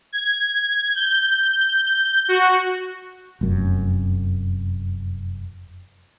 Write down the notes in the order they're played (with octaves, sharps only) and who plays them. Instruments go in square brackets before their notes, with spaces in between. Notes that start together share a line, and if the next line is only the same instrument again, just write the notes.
[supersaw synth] G#6
G6
F#4
[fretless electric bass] F1 F#2